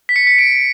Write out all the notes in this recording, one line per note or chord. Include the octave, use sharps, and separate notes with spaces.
B6
C#7
C#7
D7